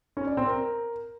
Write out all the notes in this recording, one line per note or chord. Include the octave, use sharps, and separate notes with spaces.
C#4
D5
C4
A#4